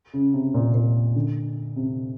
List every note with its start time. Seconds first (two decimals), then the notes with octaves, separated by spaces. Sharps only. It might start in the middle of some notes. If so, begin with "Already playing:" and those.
0.14 C#3
0.34 C3
0.54 A#2
0.74 A#2
1.15 D3
1.76 C3